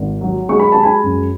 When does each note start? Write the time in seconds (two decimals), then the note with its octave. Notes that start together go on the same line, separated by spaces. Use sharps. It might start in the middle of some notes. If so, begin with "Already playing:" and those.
Already playing: G#1
0.21 F#3
0.49 G#3 C#6
0.60 B5
0.72 G#3 A5
0.83 G#5 B5
1.04 F#2